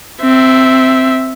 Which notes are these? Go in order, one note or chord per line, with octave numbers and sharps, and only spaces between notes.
C4 E5